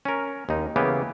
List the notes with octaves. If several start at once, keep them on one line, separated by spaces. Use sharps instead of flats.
C#4 A#4
D#2 D#4
C#3 E3 A#3 B3 G4 G#4